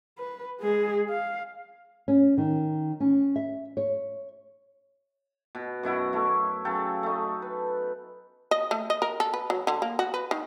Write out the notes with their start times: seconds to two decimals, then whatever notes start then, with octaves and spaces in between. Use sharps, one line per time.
0.18 B4
0.60 G#3 G#4
1.09 F5
2.08 C#4
2.38 D#3
3.00 C#4
3.36 E5
3.77 C#5
5.55 B2
5.83 F#2 B2 E4 F#5
6.13 A3 E4
6.65 C#3 F#3 A4 G5
7.03 A3 D#4
7.42 B4
8.51 D#5
8.71 A3
8.90 D#5
9.02 A#4
9.20 A4
9.34 B4
9.50 F#3
9.67 D3
9.82 A#3
9.99 F#4
10.14 B4
10.31 D#3